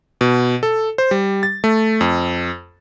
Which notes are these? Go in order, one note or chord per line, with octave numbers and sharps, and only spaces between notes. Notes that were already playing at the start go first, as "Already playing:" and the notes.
B2
A4
C5
G3
A6
A3
F2